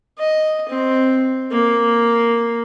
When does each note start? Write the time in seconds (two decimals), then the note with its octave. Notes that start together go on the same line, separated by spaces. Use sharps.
0.18 D#5
0.69 C4
1.51 A#3